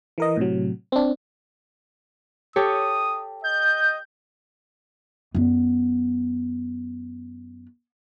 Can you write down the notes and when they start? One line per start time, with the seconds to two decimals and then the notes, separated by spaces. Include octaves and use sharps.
0.18 E3 A#4 D#5
0.37 A2 C3 F#3
0.92 C4 D4
2.56 G4 A4 C#5 D#6
3.44 D#5 G6
5.35 F#2 B3